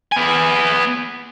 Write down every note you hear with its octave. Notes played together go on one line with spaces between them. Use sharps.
B3 G#5